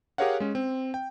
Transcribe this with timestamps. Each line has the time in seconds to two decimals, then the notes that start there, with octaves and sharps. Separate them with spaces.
0.18 G4 G#4 A#4 C#5 F5 F#5
0.40 G#3 C#4
0.55 C4
0.94 G5